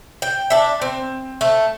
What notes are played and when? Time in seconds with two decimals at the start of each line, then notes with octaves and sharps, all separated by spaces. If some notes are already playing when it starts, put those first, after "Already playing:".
0.22 G5
0.50 D4 E5
0.82 C4
1.41 A3